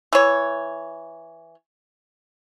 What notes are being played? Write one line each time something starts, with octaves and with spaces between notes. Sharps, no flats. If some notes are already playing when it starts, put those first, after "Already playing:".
E3 C#5